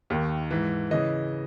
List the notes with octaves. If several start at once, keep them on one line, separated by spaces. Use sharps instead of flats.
D#2 D#3
G#2 E3
C#3 E3 D#5